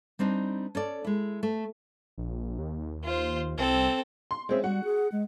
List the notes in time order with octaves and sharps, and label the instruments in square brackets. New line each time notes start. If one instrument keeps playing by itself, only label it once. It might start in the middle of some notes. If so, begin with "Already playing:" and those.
[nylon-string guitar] G3 C4 D4 D#4
C#4 A4 D5
G#3 E4
A3
[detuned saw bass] A#1
D#2
[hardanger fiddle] F4 C5
[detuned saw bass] C2 [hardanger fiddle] C4 A4
[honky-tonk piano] C6
[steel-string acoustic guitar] F3 C4 E5 [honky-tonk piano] G#3 C#4
[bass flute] G3 [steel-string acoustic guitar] F#4 [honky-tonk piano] F#5
[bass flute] G#4
G#3